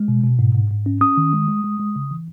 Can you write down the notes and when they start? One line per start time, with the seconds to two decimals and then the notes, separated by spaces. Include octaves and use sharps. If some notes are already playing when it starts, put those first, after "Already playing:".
Already playing: G#3
0.08 B2
0.24 B2
0.39 G#2
0.55 G#2
0.70 G#2
0.86 C#4
1.01 C#4 D#6
1.17 D#3
1.33 G#3
1.48 G#3
1.64 G#3
1.79 G#3
1.96 C#3
2.11 E3